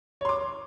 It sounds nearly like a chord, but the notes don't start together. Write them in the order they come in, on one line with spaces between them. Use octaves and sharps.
C#5 C6 D6